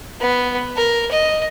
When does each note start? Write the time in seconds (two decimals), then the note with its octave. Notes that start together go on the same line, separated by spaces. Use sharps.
0.20 B3
0.77 A#4
1.11 D#5